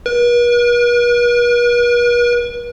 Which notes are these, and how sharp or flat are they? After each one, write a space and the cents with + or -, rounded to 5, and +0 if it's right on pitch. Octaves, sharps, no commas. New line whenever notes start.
B4 -45